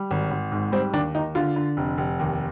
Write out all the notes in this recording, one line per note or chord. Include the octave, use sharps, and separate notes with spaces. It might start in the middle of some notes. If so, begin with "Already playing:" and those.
Already playing: G3
G#1
G#1
G#2
G3 C4
D#2 D4
D#2 D#4
D3 F4
D3
F1
F1
D#2